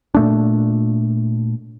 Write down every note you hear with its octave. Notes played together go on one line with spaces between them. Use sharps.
A#2 A3 D4